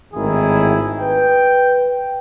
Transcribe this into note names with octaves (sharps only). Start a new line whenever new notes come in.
G#1 A2 D#3 E4 G#4
B4 G5